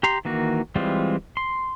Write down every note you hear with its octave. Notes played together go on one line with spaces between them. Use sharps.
G4 A#5 C6
D#3 E3 A#3 F#4
E3 G3 G#3 C4 F4
C6